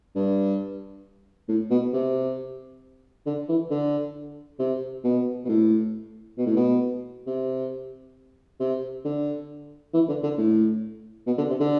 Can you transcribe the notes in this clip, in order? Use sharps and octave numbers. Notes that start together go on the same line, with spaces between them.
G2
A2
B2
C3
D3
E3
D3
C3
B2
B2
A2
B2
A2
B2
C3
C3
D3
E3
D3
D3
A2
B2
D3
C3
D3